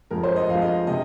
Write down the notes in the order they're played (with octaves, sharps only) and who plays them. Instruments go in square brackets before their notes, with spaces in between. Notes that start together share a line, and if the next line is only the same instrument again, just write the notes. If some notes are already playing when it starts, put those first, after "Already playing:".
[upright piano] F2 F3 G#3 A#4
C5
D#5
F2 F3 G#3 F5
D#5
C3 G#3 D#5